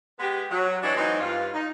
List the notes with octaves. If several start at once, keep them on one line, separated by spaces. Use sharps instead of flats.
G#3 B3 G4
F#3
E3 D4 E4 F#4 C#5 D#5
E3 F#3 A3 C4 D#4
G2 F4
D#4